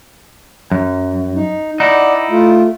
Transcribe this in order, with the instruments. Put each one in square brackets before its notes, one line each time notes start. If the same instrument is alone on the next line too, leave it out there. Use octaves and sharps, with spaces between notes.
[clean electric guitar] F#2
[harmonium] D#4
[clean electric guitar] D#4 E4 [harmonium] D5 F#5
[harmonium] A3 F4